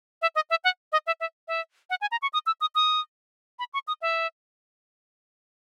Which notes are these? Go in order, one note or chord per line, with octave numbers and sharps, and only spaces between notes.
E5
D#5
E5
F#5
D#5
E5
E5
E5
F#5
G#5
A#5
C#6
D#6
E6
D#6
D#6
B5
C#6
D#6
E5